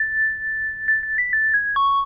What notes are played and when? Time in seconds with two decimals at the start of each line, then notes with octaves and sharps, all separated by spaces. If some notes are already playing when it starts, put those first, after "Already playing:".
Already playing: A6
0.88 A6
1.03 A6
1.18 B6
1.33 A6
1.54 G#6
1.76 C#6